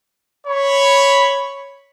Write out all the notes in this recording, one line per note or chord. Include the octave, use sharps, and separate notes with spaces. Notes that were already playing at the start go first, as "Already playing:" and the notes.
C#5 B5